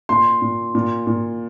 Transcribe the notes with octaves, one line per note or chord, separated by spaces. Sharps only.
A#2 C6
A#2
A#2
A#2